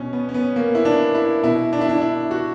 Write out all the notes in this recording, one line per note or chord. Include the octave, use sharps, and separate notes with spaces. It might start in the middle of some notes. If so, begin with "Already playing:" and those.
Already playing: B2 C#4
B3
C#4
B3
A#3
E4
D4
E4
B2 E4
D4
E4
D4
E4
F#4